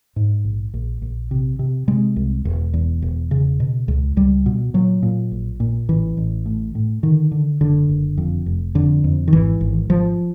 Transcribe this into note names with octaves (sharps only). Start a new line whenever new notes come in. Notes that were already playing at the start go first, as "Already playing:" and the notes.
G#2
A#1
A#1
A#1
C3
C3
C3 G#3
C2
E1
E2
E1
C#3
B2
C#2
C#2 G3
B2
A#2 F#3
A#2
A#1
A#2
A1 E3
A1
A2
A2
D3 D#3
D3
F#1 D3
F#1
F2
F1
F2 D3
F2
D#3
G#1 E3
G#1
G#1 F3